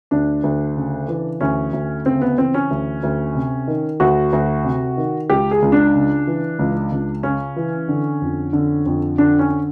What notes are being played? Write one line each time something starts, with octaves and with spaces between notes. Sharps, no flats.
D2 D4
D2
C#3
E3
D2 C#4
D2
C#3 C4
B3
E3 C4
C#4
D2
D2
C3
D#3
D2 F#4
D2
C3
D#3
C#2 G4
G#4
C#2
D4
C#3
E3
C#2
C#2
C#3 C#4
E3
D3
F2
D3
F2
D3 D4
C#4